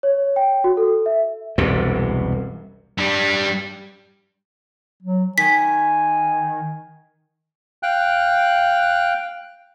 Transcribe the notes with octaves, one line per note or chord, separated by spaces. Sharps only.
C#5
G5
F#4
A4
E5
E1 C2 F#2 G3
G2 G3
F#3
D#3 G#5 B6
F5 G5 F#6